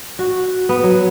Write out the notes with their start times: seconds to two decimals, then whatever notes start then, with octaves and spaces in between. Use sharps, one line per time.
0.19 F#4
0.69 B3
0.84 F#3